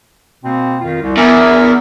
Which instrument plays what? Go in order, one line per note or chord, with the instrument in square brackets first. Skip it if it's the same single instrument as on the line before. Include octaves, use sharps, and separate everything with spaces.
[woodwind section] B2 A#3 C4
F2 D#3 F4
C2
[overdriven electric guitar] E2 [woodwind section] B3 D4 G#5 [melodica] A#4 E5